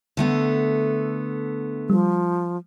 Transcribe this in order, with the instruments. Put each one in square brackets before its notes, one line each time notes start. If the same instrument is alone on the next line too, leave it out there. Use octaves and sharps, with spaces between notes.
[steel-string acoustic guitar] D3 A3 B3
[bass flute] F3 [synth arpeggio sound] G3